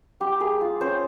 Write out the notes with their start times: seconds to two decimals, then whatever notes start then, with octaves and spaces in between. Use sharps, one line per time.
0.20 G3 G4
0.40 A#3 G#4
0.61 F4
0.80 C#4 C5